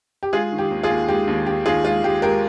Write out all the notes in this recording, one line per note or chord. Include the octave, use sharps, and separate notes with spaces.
G4
G#3 F4 G#4
D#3
G4
D#2
F4 G#4
D#2
G#3 G4
D#2
D#3 G4
D#2 F4 G#4
G#3 F4
G#3 G4
G#3 G4 A#4